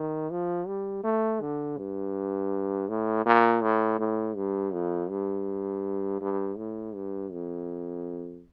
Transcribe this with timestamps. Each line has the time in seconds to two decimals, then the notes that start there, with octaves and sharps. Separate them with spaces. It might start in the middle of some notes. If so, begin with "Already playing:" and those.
Already playing: D#3
0.31 F3
0.67 G3
1.04 A3
1.41 D3
1.78 G2
2.89 A2
3.26 A#2
3.63 A2
3.99 A2
4.36 G2
4.73 F2
5.10 G2
6.21 G2
6.57 A2
6.95 G2
7.32 F2